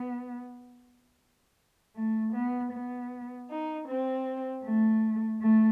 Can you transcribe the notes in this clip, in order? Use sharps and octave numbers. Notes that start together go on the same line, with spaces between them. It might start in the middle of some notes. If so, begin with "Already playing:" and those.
Already playing: B3
A3
B3
B3
D#4
C4
A3
A3